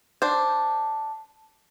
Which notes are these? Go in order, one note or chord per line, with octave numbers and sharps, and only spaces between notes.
D4 C5